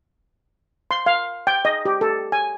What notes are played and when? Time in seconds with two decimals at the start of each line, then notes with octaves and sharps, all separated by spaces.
0.91 C6
1.06 F5
1.47 G5
1.65 D#5
1.85 G4
2.01 A4
2.32 G#5